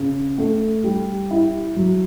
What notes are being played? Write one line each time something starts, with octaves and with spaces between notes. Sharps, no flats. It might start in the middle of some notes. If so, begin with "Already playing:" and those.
Already playing: C#3
A3
G3
E4
F#3